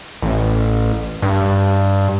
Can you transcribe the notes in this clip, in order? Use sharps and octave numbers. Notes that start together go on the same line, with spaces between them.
A1
G2